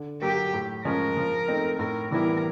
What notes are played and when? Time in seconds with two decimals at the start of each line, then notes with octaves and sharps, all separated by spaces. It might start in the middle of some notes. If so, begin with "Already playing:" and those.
Already playing: D3
0.22 F#3 A#3 G4
0.54 A2
0.85 F3 G#3 C#4 A#4
1.17 F3
1.48 A3 C4 D#4
1.79 A2 A#4
2.11 E3 G3 B3 E4 A#4